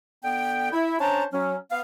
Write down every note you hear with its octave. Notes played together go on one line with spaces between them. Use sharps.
D3 B3 G5
E4
C#4 D4 C5 A5 A#5
F#3 C#4
B3 F5